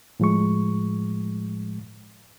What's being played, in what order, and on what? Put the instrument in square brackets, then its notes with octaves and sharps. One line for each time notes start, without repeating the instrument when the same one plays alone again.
[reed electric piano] A2 F3 G#3 C#6